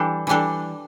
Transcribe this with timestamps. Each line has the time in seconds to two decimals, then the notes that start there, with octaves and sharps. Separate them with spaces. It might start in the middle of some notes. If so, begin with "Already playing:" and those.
Already playing: E3 G3 D4 A4
0.27 E3 G3 D4 A4